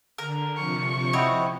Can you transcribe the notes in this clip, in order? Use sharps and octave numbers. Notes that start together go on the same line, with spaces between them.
D3 A#4
C3 F3 C#6
C4 E4 F#4 C#5 D#5